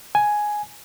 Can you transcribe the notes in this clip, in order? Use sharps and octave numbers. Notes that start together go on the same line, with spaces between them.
G#5